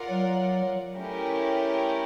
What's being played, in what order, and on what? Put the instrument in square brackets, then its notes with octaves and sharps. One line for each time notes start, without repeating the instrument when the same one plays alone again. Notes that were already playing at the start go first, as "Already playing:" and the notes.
Already playing: [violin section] F4 A#4 D5 F#5
[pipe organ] F#3
[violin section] A3 C#4 E4 G4 A#4